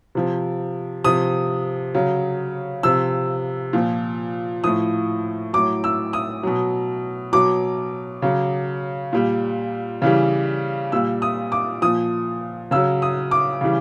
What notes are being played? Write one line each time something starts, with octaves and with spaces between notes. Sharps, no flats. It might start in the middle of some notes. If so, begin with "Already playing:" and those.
C3 F3
C3 F3 D#6
C#3 F#3
C3 F3 E6
A#2 F3
A2 F3 D#6
A2 F#3 D6
E6
D#6
B2 F#3
B2 F#3 D6
C#3 F#3
A#2 G3
C#3 E3 G3
A#2 G3 E6
D#6
D6
A#2 F3 D#6
C#3 F#3 E6
D#6
D6
C#3 E3 G3